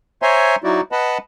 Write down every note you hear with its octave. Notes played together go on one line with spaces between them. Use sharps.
C5 C#5 E5 G#5 A#5 C6
F#3 D#4 E4 F#4 D5
B4 D#5 F#5 A5 B5